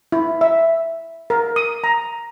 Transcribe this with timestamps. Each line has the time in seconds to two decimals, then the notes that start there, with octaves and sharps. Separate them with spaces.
0.12 E4
0.41 E5
1.30 A#4
1.56 D#6
1.84 A#5